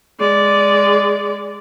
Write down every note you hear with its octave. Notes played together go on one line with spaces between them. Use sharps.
G#3 D5